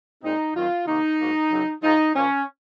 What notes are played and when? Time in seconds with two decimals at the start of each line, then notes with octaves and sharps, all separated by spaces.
0.23 A#2 G#3 C4 D#4
0.55 F#2 D#3 F#3 C4 F4
0.87 C3 D#3 A#3 D#4
1.19 G#2 F#3 A#3
1.51 F#2 C#3 F#3
1.83 G#2 F3 G#3 D#4
2.15 A#2 F3 A#3 C#4